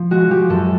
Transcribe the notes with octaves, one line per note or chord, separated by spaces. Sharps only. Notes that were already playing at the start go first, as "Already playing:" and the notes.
Already playing: F3
G#3 F#4
F3 G4
F#2 A4